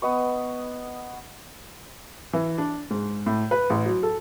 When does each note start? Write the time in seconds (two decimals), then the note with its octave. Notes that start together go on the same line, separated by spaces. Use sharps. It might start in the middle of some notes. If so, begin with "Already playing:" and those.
0.02 B3 D#5 C#6
2.33 E3
2.58 D4
2.91 G#2
3.26 A2
3.51 B4
3.70 A1
3.86 F#3
4.03 A4